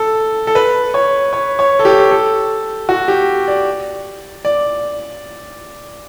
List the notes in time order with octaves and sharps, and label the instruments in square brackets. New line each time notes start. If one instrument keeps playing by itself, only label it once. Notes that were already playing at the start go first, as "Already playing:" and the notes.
Already playing: [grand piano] A4
A4
B4
C#5
C#5
C#5
A4
G4
A4
F#4
G4
D5
D5